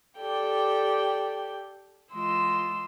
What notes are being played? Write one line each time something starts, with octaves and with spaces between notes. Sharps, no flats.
G4 A4 D5 G5
E3 G#3 F4 D#5 C6 E6